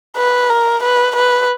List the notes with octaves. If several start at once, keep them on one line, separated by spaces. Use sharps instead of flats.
B4
A#4
B4
B4